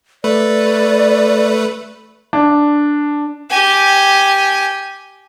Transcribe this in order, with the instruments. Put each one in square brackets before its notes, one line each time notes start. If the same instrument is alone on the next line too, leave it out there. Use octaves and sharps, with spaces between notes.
[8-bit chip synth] A3 B4 [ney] D5
[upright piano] D4
[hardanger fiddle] G4 G#5